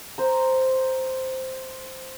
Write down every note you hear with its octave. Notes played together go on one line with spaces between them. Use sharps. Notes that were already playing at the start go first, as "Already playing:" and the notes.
C5 A#5